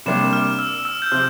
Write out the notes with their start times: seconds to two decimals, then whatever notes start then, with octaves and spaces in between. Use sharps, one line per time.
0.06 C3 G3 A#3 D4 E7
0.33 F6
0.59 E6
0.85 E6
1.02 G6
1.11 C3 F3 C4 F6